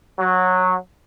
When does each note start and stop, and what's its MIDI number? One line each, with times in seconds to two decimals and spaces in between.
0.19 0.75 54